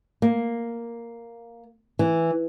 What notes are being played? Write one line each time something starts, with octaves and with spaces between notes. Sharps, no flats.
A#3
E3